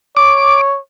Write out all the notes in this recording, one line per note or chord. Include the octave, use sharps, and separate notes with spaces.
C#5 D6